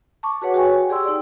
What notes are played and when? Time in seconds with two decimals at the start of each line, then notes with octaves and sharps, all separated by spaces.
0.23 A5 C#6 D6
0.42 F#4 G#4 B4 C#5 F#5
0.54 F#4 G#4 G5 G#5 C#6
0.90 G4 G#4 D5 G5 C6 E6
1.05 D#4 D5